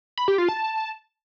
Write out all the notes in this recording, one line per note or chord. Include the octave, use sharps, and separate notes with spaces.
B5
G4
F4
A5